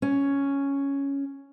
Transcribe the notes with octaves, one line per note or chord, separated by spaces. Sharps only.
C#4